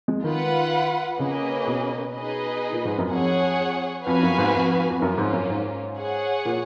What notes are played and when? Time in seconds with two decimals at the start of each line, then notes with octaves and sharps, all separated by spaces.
0.08 G#3
0.24 D#3 F4 B4 F#5
1.19 C#3 A#3 C#4 G#4 B4 D#5
1.67 B2
2.15 D#4 G#4 B4 D#5
2.72 A#2
2.85 G#2
2.98 F#2
3.10 F2 G#4 C#5 F#5
4.06 F2 B3 F#4 B4 F5 G#5
4.23 F#2
4.38 G#2
4.54 F2
4.89 F2
5.02 F#2 A#3 C#4 F4
5.18 G#2
5.33 F#2
5.50 G#2
5.98 G#4 C#5 F#5
6.45 A#2